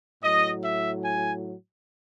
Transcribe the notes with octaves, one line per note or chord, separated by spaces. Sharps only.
A2 F#3 D#5
E5
G#5